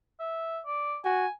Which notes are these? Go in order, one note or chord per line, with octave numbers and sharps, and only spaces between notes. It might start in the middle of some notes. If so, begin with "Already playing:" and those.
E5
D5
F#4 G#5